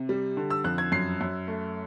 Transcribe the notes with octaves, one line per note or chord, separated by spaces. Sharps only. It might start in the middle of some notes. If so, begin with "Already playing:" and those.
Already playing: C3
G3
D3
E6
F2 F#6
G#6
F#2 C7
F#2
A3